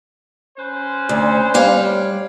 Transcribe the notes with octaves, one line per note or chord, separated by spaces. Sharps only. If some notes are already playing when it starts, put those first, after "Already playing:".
C#4 B4 C5
D2
G3 C#5 F5